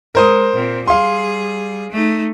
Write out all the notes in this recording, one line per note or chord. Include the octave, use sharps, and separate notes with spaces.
G#3 A#4 C5 D#6
A#2 C4
G3 G#4 F5 C6
A3 D#4